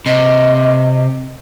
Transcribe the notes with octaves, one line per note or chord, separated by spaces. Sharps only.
C3 D#5